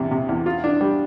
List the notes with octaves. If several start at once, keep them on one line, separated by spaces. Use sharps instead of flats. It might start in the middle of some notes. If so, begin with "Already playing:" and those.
Already playing: E2 C3
C3
E2
F4
D4
G3